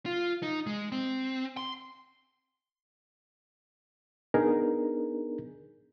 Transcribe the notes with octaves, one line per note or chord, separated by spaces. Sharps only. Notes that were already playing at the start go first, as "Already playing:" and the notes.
F4
D#4
G#3
C4
C6
B3 D4 D#4 G#4 A#4